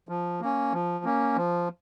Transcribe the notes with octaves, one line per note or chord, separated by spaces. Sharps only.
F3
A#3 C#4
F3
A#3 C#4
F3